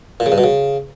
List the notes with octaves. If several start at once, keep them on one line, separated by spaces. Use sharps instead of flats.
A#2
C#3
G2
B2
C#3